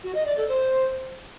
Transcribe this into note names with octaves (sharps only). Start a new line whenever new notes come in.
F#4
D#5
D5
A4
C5